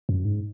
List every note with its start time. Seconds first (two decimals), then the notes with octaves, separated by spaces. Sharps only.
0.09 F#2
0.25 G#2